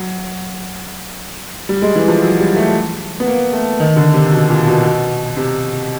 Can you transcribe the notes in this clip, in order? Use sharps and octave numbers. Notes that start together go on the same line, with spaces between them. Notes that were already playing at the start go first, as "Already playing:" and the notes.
Already playing: F#3
G3
G#3
E3
F3
F#3
G3
A3
B3
A#3
A3
D#3
D3
C3
B2
A#2
B2
B2
C3